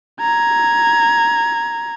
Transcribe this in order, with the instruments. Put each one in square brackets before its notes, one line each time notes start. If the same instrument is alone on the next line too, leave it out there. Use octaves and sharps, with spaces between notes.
[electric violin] A#5 G#6